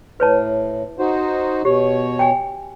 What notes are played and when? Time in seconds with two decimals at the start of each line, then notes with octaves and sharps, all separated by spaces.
0.20 A2 B4 C#5 A5
0.99 D#4 F#4 C5
1.65 B2 G4 C#5
2.19 G5 G#5